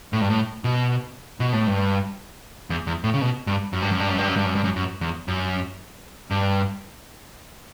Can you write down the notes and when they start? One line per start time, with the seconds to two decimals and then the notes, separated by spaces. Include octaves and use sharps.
0.13 A2
0.21 G2
0.30 A2
0.64 B2
1.40 B2
1.53 A2
1.67 G2
2.70 E2
2.87 E2
3.04 A2
3.14 C#3
3.21 B2
3.47 G2
3.73 F#2
3.82 G2
3.91 F#2
4.00 G2
4.09 F#2
4.18 G2
4.28 F#2
4.36 G2
4.46 F#2
4.55 G2
4.64 F#2
4.76 F#2
5.01 E2
5.28 F#2
6.31 G2